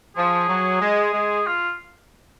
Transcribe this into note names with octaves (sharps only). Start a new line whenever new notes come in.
F3 G#4
F#3
G#3
G#3
F4